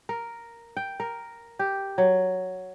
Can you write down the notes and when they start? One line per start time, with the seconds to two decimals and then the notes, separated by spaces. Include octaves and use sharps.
0.09 A#4
0.77 G5
1.00 A#4
1.59 G4
1.98 F#3